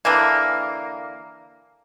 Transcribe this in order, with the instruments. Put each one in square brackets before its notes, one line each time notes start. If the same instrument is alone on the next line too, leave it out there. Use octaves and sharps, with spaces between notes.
[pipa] D3 E3 A#3